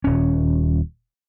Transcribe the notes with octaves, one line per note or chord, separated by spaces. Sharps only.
D#1 C#4